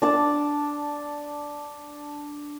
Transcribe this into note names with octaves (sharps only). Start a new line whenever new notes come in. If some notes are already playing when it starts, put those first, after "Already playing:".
D4 D5 A5